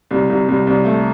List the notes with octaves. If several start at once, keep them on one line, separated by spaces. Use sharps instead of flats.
C2
C2
C2
C2
A3